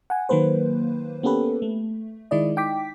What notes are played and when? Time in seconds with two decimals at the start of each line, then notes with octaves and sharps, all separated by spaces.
0.10 F#5 G#5
0.29 D#3 F#3 A#3 B4 C5
1.23 A#3 B3 C#4 G4 A4 B4
1.62 A3
2.31 D#3 G#3 E4 D5 D#5
2.56 D#4 G5 D6 B6